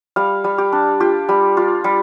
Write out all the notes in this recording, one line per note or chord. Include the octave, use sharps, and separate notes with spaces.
G3 F5
G3
G4
D4
F4 G4
G3
F4
G3